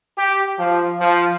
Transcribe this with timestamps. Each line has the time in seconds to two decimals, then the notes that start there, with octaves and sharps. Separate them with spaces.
0.18 G4
0.58 F3
1.01 F3